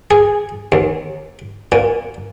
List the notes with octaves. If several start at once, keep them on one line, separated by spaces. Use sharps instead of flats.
G#4
D#2
A#2